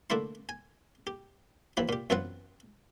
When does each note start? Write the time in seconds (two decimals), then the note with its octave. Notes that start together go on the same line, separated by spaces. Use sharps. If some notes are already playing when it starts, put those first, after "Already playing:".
0.10 D3 A3 A#3 E4 C6
0.49 G#5
1.07 G4
1.77 D#2 E3 F3 B5
1.89 A#2 G4
2.10 F#2 E3 B3 C4 F4 F#5